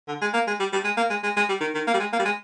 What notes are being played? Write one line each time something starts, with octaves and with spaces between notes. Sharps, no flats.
D3
G#3
A#3
G#3
G3
G3
G#3
A#3
G#3
G#3
G#3
G3
D#3
D#3
A#3
G3
G#3
A#3
G3
G#3